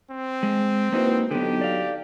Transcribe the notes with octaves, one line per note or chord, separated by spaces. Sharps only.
C4
G#3
A#3 D#4 E4 F#4 B4 C5
D3 F#3 B3 D#4 G4 A4
D5 F5